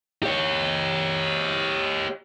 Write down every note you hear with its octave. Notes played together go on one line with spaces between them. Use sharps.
G4 C#5